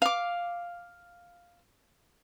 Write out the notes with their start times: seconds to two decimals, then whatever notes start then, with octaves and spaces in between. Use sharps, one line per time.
0.02 F5 D6